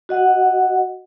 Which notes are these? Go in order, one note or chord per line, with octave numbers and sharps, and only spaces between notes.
F#4 D#5 F#5